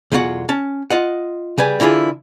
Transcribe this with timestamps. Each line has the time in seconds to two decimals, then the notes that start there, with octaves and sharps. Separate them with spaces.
0.12 B1 E2 G#3 F4 F#4 F#5
0.49 C#4 A5
0.90 F4 D#5 F#5
1.58 C#3 G3 B4 G#5
1.80 D3 E3 E4 F4 G#4